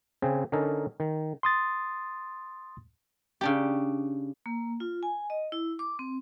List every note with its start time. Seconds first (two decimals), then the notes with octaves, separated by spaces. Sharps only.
0.22 C#3 C4 G#4 C5
0.52 D3 C#4 D#4 A4 A#4
1.00 D#3
1.43 C6 D#6 A6
3.41 C#3 D4 G4
4.46 A#3
4.80 F4
5.03 G#5
5.30 D#5
5.52 E4
5.79 D6
5.99 C4